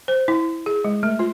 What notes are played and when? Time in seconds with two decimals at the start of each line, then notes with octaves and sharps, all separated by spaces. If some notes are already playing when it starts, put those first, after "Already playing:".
0.08 C5
0.28 E4
0.66 G#4
0.84 G#3
1.03 A3
1.19 F4